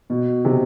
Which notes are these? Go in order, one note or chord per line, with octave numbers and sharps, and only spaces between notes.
B2
C3